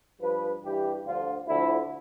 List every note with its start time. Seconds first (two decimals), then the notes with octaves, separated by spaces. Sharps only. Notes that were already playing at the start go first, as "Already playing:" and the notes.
0.21 G2 F3 B4
0.63 G2 E3 G4
1.05 D2 D3 F3 F4
1.47 D2 D3 F3 E4